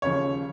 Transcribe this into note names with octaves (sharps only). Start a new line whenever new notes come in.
D#2 C#3 F3 C#5